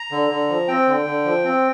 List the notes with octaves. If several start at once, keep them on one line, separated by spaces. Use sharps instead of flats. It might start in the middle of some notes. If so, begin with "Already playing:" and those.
Already playing: A#5
D3
D3
F3
C4 G5
D3
D3
F3
C4